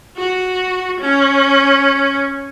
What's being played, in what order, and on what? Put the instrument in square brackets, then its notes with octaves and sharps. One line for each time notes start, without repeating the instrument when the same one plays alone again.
[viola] F#4
C#4